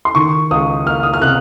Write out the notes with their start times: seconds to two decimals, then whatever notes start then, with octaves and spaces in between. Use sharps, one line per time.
0.05 C6
0.15 D#3 C#6
0.51 C#2 D#6
0.86 A#3 F6
1.03 D#6
1.14 F6
1.22 C3 F#6